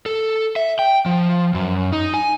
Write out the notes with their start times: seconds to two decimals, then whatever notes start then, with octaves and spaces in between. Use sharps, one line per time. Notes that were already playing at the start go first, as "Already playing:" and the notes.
0.06 A4
0.56 E5
0.79 G5
1.06 F3
1.54 F#2
1.92 D#4
2.14 G#5